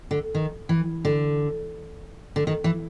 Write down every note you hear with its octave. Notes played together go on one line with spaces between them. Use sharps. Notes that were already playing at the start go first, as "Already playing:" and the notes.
D3
D#3
E3
D3
D3
D#3
E3